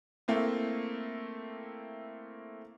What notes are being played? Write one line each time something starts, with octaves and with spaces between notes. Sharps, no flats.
A3 A#3 C4 E4